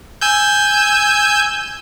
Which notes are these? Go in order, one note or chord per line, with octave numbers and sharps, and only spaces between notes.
G#5 E6 G6